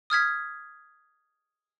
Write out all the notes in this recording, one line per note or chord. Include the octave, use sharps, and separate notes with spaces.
D#6 F6 G#6 B6